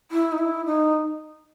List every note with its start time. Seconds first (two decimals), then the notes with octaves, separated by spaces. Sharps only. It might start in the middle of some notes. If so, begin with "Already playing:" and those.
0.11 E4
0.32 D#4
0.38 E4
0.66 D#4